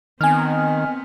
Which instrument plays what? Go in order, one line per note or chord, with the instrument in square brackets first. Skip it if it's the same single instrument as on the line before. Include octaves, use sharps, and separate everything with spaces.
[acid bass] D#3 [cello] B3 C4 [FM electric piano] G#5 F6